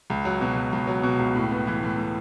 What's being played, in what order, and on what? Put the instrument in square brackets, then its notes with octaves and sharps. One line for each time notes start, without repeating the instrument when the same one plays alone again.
[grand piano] C#2
F#3
B2
C#2
C#2
F#3
B2
C#2
A2
B3
E3
A2
A2